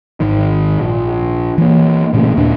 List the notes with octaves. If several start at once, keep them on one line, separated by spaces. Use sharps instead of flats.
G#1 D#3
A#1
E3 A#3
A1 A#2 C#3 A3
D#2 A#2 D4